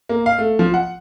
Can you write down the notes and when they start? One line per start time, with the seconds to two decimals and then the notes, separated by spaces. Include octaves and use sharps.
0.09 A#3
0.26 F5
0.38 A3
0.59 F3
0.74 F#5